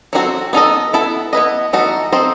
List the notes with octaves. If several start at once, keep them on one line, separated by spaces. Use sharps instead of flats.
F#3 C4 D#4 F#4 A4
B3 D#4 A4 D#5
B3 E4 A4
B3 E4 B4 D#5
E3 A3 D#4 F#4
C4 D#4 A4 C5 D#5